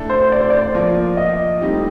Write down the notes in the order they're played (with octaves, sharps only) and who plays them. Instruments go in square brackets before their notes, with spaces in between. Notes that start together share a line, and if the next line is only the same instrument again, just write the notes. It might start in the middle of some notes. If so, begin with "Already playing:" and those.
Already playing: [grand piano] A2 A3 D4 A4
[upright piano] C5
D5
C5
D5
[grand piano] F3 A#3 F4
[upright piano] D#5
[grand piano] A2 G3 C4 D#4 G4